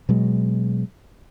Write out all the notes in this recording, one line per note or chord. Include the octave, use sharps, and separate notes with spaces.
B2 F#3 G#3